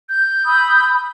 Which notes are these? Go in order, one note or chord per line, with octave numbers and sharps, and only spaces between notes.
G6
B5 D#6 E6